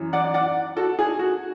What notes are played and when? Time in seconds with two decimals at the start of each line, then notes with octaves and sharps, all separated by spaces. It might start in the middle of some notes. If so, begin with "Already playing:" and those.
Already playing: F#2 E3
0.13 D5 F#5
0.34 D5 F#5
0.76 F#4 A4
0.99 G#4
1.19 F#4